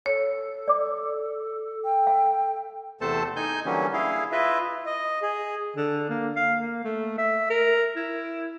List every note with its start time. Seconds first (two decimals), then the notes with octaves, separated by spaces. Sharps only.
0.06 A4 C#5
0.68 D5 D6
1.84 G5
2.07 F5
3.01 E2 C3 A3 A4 C5 A5
3.36 D#4 G#5 G6
3.65 D3 E3 F#3 G3 A#3 C#4
3.93 E4 G#4 F5
4.32 E4 F4 B4 D#5 E5
4.86 D#5
5.22 G#4
5.77 D3
6.10 A#3
6.36 F5
6.60 A#3
6.84 A3
7.18 E5
7.50 A#4
7.96 E4